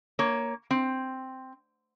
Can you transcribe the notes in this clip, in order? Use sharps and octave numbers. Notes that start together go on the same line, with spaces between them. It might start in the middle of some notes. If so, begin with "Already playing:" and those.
A#3 C#5
C4